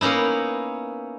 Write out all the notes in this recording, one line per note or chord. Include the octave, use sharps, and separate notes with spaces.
A#3 B3 C#4 D#4 E4